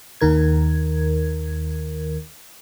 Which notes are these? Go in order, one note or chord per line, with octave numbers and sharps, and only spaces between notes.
D#2 D#3 A#4 G#6